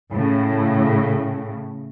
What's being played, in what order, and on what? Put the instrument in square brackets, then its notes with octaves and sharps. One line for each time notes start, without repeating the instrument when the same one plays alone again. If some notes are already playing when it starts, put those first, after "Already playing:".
[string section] A2 C#3